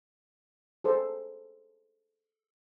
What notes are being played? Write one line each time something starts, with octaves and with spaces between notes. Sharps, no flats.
G#4 A4 C5